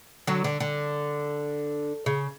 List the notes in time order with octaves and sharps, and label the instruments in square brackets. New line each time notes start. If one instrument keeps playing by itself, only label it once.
[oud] D3 F#3
D3
D3
C#3